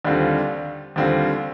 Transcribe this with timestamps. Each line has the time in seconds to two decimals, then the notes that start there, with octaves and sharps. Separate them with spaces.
0.05 D#2 D3 G3 C4 F4
0.96 D#2 D3 G3 C4 F4